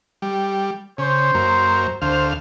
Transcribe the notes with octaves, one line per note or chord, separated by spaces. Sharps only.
G3
C#3 C5
F#2 A#3
D2 C5 F5